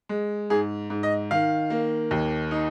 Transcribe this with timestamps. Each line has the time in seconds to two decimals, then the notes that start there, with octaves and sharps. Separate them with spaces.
0.09 G#3
0.50 G#2 G#4
0.90 G#2
1.03 D#5
1.31 D#3 F5
1.70 A#3
2.11 D#2
2.51 D#4